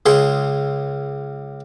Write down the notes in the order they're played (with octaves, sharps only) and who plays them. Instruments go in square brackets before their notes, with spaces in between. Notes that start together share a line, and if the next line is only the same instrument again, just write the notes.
[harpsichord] C#2 G#4 C6